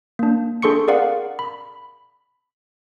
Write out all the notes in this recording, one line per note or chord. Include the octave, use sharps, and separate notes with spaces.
A#3 D4
D4 G#4 A4 C6 C#6 C#7
G#4 A#4 D5 F5 F#5
B5